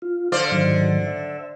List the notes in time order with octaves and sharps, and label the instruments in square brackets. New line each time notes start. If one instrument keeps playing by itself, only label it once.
[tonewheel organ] F4
[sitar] D3 C5 D5 [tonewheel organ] F5 F6
[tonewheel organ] G#2 D#3 F#3
E5